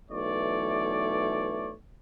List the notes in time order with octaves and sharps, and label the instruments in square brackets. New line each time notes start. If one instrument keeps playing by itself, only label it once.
[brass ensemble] B1 E3 A3 C#5 D5